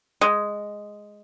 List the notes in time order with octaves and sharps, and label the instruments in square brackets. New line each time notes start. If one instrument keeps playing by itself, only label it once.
[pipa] G#3